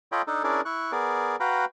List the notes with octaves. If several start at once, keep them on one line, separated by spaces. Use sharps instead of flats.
F4 A4 C#5 D#5 G5 B5
D4 D#4 A4
C#4 D4 E4 G#4 A#4 D5
E4 C#6 F#6
B3 G#4 A#4 D5
F#4 B4 F5 G5 A#5 B5